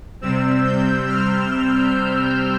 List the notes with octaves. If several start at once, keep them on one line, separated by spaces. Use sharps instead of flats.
C3 G3 C4 E6
G6
F6